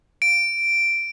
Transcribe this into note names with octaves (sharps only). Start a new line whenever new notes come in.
D7